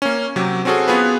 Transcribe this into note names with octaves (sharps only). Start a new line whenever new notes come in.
A#3 C#4
C3 F#3 G4
C4 C#4 F#4 G#4 A4
B3 F4 G#4 B4